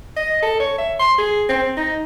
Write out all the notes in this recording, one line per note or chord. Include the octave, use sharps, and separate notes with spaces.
D#5
A4
C#5
E5
C6
G#4
C4
D#4